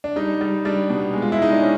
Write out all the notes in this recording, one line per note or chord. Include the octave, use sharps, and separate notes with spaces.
D4
G3 D#4
G3
G3 D4
B2
G#3
F4
E4
G#3 D#4
D4
C#4